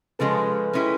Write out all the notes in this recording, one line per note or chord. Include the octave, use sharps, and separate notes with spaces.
C#3 F3 G#3 C#4 A4 B4
G#3 C#4 E4 G4